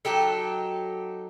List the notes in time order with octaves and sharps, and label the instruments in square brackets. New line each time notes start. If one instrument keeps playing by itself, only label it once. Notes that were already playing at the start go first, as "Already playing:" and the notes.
[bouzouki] F#3 D#4 G4 A4